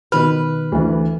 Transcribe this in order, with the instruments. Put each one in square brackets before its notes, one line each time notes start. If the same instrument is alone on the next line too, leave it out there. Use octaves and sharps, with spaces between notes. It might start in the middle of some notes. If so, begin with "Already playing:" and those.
[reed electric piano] B2 D#3 F6 [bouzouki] B4
[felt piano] D2 E3